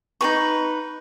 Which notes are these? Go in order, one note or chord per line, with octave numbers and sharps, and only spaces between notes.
D#4 G#4 B4 C#6